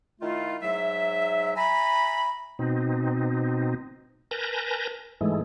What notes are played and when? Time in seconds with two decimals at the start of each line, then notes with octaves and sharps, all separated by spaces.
0.21 D#3 A3 E4 F4
0.62 G#2 F#3 E5
1.56 E5 G#5 A#5 B5
2.59 B2 C4 D#4
4.31 A#4 B4 G#5 A5 G6 A#6
5.21 G#2 E3 G#3 A3